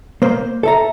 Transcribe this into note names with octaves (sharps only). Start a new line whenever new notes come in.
A#3 C5
A4 E5 A#5